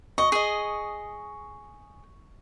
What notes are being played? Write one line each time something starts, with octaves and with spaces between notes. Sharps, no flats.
D#5 C#6
G#4 D#5